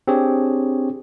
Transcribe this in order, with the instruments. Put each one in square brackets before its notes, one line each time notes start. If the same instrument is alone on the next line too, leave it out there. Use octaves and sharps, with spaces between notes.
[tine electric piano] C4 D4 G4 G#4 C#5